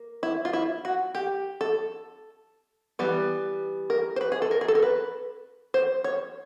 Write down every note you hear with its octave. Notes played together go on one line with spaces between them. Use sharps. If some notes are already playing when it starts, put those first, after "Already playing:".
Already playing: A#3
E4
F4
E4
F#4
G4
A4
E3 G3 B3
A#4
C5
B4
G#4
A4
A#4
G#4
A4
A#4
B4
C5
C#5